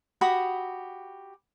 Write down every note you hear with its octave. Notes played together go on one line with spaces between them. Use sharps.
F#4 G4 B5 D#6